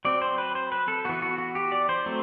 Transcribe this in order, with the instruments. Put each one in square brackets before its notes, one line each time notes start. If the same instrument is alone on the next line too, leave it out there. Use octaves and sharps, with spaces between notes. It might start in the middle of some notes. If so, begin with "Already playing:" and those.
[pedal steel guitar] F#3 C4 D5
C5
B4
C5
B4
A4
E3 B3 F#4
F#4
F#4
G4
D5
C5
F#3 A3 C4